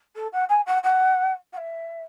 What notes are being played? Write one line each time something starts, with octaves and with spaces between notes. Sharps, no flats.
A4
F#5
G#5
F#5
F#5
F#5
E5